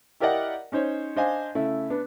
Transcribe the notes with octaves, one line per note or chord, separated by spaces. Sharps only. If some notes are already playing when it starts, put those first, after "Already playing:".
E4 G4 A#4 D5 D#5 F#5
C#4 D#4 C5 C#5
D4 C5 D#5 F5 G#5
C#3 A3 E4
B3 D4